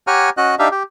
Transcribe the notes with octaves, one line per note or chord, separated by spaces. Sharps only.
G4 C#5 F#5 G#5 A#5 F6
C#4 F#4 D#5 F#6
D4 D#4 G4 E5 F5
G4